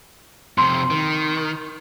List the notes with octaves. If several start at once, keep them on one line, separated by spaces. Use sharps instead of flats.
F2 C3 C6
D#3